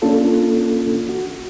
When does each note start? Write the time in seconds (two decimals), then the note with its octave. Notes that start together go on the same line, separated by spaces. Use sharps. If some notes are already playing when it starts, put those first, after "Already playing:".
0.02 A#3 C#4 D4 F4 A4
1.09 F#4